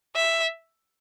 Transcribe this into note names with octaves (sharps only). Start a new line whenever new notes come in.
E5